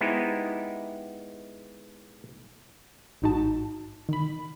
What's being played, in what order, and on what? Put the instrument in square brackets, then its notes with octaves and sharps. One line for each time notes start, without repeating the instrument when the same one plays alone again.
[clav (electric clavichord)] G#3 B3 D#4 E4 G4 C5
[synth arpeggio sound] A1 G#2 D#4 F#4 A5
D#3 B5